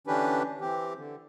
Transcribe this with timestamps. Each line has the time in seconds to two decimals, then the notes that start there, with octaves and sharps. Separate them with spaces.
0.07 D3 E3 C#4 D4 G4 B4
0.61 E3 C4 G4
0.97 D3